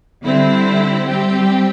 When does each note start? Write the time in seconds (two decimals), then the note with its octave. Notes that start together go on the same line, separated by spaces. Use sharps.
0.24 D3 G3 C4 E4
1.06 G3 C4 G4